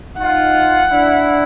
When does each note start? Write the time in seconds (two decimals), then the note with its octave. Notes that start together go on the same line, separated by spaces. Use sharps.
0.18 D#4 F4 F#5
0.91 D4 E4